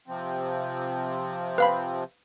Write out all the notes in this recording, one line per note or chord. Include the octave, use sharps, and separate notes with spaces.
C3 F3 C4
B4 F5 B5